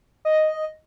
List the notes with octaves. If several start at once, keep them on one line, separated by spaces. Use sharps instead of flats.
D#5